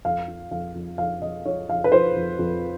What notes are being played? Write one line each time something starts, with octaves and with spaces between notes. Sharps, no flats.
F2 F5
F3
F2 F5
F2
F2 F5
F2 D#5
F3 C#5
F2 F5
B4
F3 C5
F2
F2